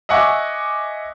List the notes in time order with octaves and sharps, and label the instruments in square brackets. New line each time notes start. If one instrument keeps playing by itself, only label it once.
[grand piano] D#5 E5 F#5 G#5 C#6 D6